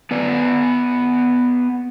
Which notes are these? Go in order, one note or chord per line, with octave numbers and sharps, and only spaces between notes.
B3 B4 D5